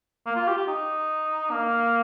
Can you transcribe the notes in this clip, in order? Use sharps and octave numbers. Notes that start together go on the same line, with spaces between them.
A#3
F4
G4
G4
D#4
A#3